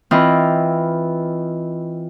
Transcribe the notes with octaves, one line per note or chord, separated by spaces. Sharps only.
E3 C4 F4 B4 D#5